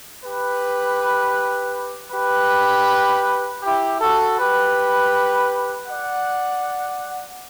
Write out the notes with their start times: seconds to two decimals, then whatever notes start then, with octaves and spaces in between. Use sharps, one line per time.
0.24 G4 B4
2.12 G4 B4
3.63 E4 G4
4.00 F#4 A4
4.38 G4 B4
5.88 D5 F#5